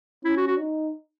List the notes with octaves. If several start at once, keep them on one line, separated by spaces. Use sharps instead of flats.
C#4 E4
F#4
F#4
D#4